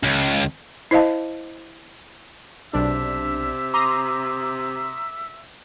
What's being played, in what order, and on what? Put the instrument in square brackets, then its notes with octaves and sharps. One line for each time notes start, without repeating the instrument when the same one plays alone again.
[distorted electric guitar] C#2
[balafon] E4 C5 D#5 F5 A5
[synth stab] B1 D4 [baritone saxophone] C3 [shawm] E5
[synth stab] A#5 C6 D#6 [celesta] D6